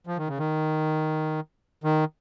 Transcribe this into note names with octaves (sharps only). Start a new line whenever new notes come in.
F3
D#3
C#3
D#3
D#3